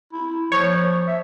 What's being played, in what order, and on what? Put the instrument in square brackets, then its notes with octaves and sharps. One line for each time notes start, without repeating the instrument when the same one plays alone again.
[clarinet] E4
[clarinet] F3 [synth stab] C#5
[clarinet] E5